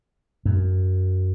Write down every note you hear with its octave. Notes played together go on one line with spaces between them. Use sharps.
F#2